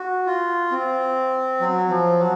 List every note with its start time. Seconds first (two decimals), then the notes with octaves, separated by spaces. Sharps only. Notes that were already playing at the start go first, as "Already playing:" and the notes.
Already playing: F#4
0.26 F4
0.71 C4
1.60 F#3
1.90 F3
2.19 F#3